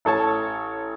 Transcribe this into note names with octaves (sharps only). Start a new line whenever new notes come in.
A1 A4 C#5 A5